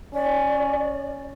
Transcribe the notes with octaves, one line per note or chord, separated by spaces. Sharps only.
C#4 D5